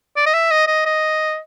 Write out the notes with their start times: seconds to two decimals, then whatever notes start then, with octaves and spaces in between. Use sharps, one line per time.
0.17 D5
0.26 D#5
0.34 E5
0.51 D#5
0.67 D#5
0.86 D#5